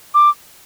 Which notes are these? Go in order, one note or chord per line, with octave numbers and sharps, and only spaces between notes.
D6